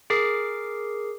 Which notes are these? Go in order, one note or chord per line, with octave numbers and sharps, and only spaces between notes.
G#4 A#4 D6 C7